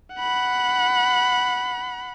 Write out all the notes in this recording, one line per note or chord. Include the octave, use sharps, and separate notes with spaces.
F#5 B5